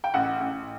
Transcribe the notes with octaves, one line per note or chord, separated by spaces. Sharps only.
G5
A1 F#5
A1